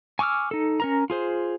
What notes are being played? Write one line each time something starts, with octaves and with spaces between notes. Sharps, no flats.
G#5 C#6 D6 E6 F6
D#4 A4
C#4 A#4 A#5
F4 G#4 C5